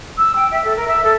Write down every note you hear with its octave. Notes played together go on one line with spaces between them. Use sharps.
E6
G5
E5
A4
A#4
E5
A4